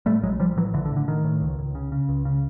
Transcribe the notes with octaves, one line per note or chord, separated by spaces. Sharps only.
A2 G3 A3
A#1 F#3 G#3
A#1 F3 G3
A2 E3 F#3
A#1 D3 E3
D3
A2
D3
A2 D#3
A2
C#2
C#2
C#3
C#3
C#2
C#3